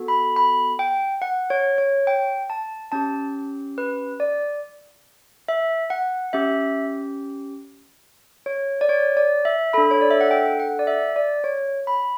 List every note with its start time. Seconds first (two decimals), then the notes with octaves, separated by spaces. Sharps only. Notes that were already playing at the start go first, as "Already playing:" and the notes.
Already playing: B3 F#4 A4
0.08 B5
0.36 B5
0.79 G5
1.22 F#5
1.50 C#5
1.78 C#5
2.07 G5
2.50 A5
2.92 C#4 G4 A5
3.78 B4
4.20 D5
5.48 E5
5.90 F#5
6.33 C#4 G4 E5
8.46 C#5
8.81 D5
8.89 C#5
9.17 D5
9.45 E5
9.73 D4 A4 B5
9.91 C#5
10.01 D5
10.11 E5
10.21 F#5
10.31 G5
10.60 F#5
10.79 D5
10.87 E5
11.16 D5
11.44 C#5
11.87 B5